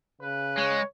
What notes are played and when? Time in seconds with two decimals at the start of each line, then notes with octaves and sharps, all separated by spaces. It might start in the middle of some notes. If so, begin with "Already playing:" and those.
0.21 C#3 B4
0.58 G#3 C#5